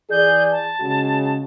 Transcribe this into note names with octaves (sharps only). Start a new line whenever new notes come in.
E3 G#4 D5 G6
A5
C#3 G#3 F#4